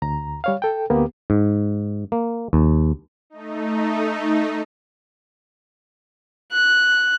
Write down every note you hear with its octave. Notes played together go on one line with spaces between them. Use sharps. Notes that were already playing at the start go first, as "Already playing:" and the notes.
D2 A#5
G3 C#5 F5
A4 G5
D2 A#3 B3 G4
G#2
A#3
D#2
A3 D#4
F#6